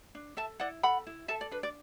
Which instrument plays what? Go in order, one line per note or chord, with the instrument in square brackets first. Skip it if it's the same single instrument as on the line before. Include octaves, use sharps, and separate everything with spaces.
[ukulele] D4
A4 E5 A5
E4 D5 F#5
A4 F#5 B5
E4
A4 E5 A5
D5
D4 B4
D5